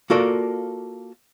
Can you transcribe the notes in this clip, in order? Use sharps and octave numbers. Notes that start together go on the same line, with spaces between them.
A#3 F4 F#4 A4 A#4 D5